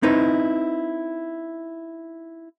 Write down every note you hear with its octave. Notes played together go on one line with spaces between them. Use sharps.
C4 D#4 E4 B4